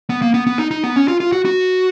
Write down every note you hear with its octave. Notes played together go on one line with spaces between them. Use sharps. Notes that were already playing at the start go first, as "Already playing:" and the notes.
B3
A#3
B3
B3
D#4
D#4
B3
C#4
F4
F4
F#4
F#4